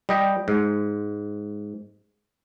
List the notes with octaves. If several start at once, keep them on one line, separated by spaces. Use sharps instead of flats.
G3 D#5 G5
G#2